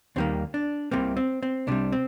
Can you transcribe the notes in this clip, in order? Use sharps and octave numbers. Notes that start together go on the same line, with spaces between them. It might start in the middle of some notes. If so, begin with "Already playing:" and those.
D#2 D#3 G3 A#3 C4
D4
C2 C3 G3 A#3 C4
C4
C4
C2 C3 G3 D4
C4